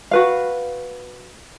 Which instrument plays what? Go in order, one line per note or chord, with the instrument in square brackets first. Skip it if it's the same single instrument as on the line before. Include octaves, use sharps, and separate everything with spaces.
[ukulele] F#4 B4 F5